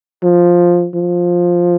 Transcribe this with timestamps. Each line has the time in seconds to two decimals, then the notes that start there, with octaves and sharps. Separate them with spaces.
0.23 F3
0.95 F3